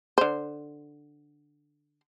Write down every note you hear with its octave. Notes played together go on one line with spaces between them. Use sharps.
D3 C5